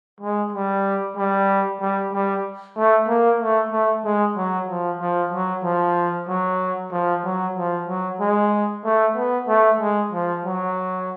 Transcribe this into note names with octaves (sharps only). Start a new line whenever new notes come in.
G#3
G3
G3
G3
G3
A3
A#3
A3
A3
G#3
F#3
F3
F3
F#3
F3
F#3
F3
F#3
F3
F#3
G#3
A3
B3
A3
G#3
F3
F#3